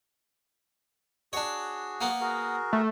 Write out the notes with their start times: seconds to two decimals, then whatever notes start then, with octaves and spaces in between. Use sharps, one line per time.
1.33 D4 F#4 G#4 C#5
2.01 A#3 B3
2.21 F#4 G#4 A#4
2.73 A3